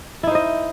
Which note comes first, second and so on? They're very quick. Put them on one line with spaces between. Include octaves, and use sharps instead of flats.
E4 D#4 C5 D#5